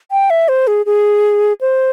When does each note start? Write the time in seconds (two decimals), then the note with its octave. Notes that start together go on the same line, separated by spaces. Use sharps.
0.11 G5
0.30 E5
0.49 C5
0.67 G#4
0.86 G#4
1.61 C5